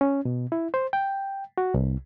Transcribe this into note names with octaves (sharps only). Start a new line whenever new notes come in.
C#4
B2
E4
C5
G5
F#4
C2